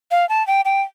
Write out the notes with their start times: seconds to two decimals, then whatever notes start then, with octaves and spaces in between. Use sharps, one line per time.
0.11 F5
0.29 A5
0.47 G5
0.65 G5